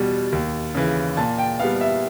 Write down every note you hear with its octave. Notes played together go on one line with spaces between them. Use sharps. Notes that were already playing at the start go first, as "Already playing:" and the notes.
Already playing: E2 B2 G3
D#2
C#3 E3
A#2 A5
G5
G3 B3 F5
E5